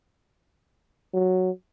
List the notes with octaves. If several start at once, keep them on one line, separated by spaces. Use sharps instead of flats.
F#3